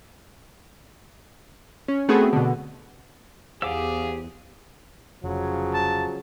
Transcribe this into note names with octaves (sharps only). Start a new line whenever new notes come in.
C#4
A3 B3 C4 F#4 G#4
B2 D3
E2 G4 G#4 C5 F5 F#5 D6 E6
F1 C#3 F3 F#3
A5